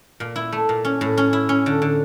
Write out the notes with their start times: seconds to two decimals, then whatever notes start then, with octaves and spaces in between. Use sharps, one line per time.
0.20 A#2
0.36 E4
0.52 A3
0.69 A#2
0.85 C#4
1.01 A2
1.18 C#4
1.33 E4
1.49 C#4
1.66 D3
1.82 D3